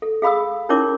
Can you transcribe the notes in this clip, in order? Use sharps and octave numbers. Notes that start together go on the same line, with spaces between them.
A4
G#4 F5 B5 D#6 E6
C#4 D#4 E4 A#4 C#5 D6